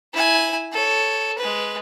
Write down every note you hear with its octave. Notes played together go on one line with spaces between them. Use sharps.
E4 G#5
A4 C#5
G#3 B4